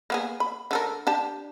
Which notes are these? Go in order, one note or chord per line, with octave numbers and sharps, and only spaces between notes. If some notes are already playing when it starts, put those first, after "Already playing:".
A#3 B3 G#4
B5
D3 A4 A#4
D4 G4 A5